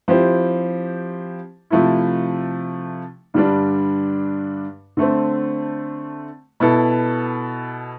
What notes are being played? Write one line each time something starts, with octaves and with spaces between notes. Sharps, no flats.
F3 C4 E4 G4 C5
C3 F3 A3 E4
G2 D3 G3 D4
D3 A3 C4
B2 B3 E4 A4